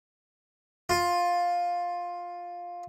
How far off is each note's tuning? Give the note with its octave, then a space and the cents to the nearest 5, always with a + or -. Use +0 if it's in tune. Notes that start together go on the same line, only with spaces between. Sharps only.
F4 +10